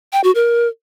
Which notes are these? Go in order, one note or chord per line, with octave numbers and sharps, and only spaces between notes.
G5
F#4
A#4